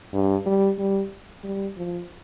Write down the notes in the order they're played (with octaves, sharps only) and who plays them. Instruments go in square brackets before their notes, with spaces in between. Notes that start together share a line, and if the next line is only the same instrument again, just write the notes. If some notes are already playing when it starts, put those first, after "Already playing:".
[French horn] G2
G3
G3
G3
F3